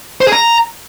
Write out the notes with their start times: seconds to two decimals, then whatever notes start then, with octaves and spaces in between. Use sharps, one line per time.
0.21 C5
0.27 G#4
0.32 A#5